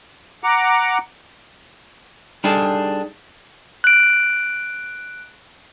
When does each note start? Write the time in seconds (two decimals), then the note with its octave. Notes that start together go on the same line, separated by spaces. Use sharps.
0.44 F#5 A#5 D6
2.44 G3 D4 D#4 G#4 A4
3.84 F#6 D7